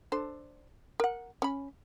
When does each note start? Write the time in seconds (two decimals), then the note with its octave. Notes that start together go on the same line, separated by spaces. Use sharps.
0.12 D4 A4 C5
1.00 A#4 F#5
1.42 C#4 B5